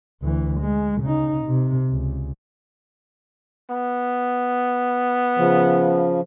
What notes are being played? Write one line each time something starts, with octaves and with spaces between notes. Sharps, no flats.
D2 E3
G#3
C#3 D#4
C3
C#2
B3
C#3 F3